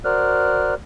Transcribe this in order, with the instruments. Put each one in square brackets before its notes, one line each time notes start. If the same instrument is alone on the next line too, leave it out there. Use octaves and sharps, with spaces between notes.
[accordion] F#4 A#4 C5 D5 F6 F#6